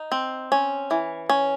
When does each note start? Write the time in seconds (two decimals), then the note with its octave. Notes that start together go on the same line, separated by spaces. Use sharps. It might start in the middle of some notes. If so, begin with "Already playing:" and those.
Already playing: D#4
0.12 C4
0.52 C#4
0.91 E3
1.30 C#4